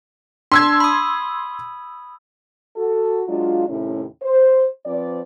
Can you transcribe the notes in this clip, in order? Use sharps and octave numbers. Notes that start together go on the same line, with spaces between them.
D4 C6 E6 G#6
B5 D#6
F#4 A4
F#3 G#3 D4 F4
D#2 A2 C3 C#4 E4
C5
F3 C4 B4 D5